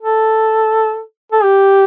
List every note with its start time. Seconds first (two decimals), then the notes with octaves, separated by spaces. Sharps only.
0.01 A4
1.32 A4
1.43 G4